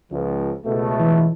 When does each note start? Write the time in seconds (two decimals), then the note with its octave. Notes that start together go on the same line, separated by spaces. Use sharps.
0.11 C#2 F3
0.65 C#2 B2 A3
1.00 E3